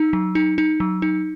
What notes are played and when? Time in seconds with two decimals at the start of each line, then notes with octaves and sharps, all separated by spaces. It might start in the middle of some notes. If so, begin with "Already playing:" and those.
Already playing: D#4 E6
0.13 F#3
0.35 D#4
0.58 D#4
0.80 F#3
1.02 D#4